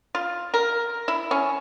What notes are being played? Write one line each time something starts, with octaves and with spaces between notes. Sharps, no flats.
F4
A#4
E4
C#4